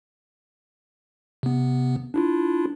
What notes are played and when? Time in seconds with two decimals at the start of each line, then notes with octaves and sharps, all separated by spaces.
1.43 C3 B3
2.14 D4 E4 F4